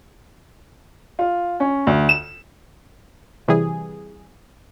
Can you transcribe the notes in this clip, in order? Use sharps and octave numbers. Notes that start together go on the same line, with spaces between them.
F4
C#4
D2
E7
C3 E3 G3 G#4